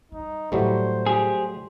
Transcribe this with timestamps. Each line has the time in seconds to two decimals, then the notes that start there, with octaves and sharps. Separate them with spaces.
0.12 G3 D#4
0.52 A2 F#3 G3 A3 C5
1.06 G4 G#4